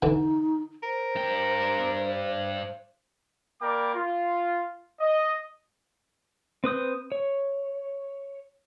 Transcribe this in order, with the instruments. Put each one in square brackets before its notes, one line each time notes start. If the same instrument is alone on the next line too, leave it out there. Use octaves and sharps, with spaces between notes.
[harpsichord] D3 E3 [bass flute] D#4
[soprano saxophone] A#4 [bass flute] C5
[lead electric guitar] G2 G5
[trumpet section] A#3 A#4 D5 G5 B5 D6
F4
D#5
[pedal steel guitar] C4 B4 D#6 G6
C#5